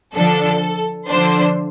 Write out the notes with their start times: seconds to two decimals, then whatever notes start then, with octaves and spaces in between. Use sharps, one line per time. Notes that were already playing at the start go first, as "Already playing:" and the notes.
0.14 D3 F3 D4 A4
1.08 D3 F3 D4 C5